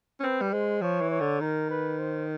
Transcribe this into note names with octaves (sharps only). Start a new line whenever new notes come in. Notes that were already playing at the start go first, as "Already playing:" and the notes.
C#4
C4 B4
G3
G#3 C5
F3 C#5
E3
C#5
D3
D#3 A#4
B4
C5